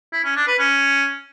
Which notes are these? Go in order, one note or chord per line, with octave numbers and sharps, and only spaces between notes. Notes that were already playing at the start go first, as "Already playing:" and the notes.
E4
C#4
D4
B4
C#4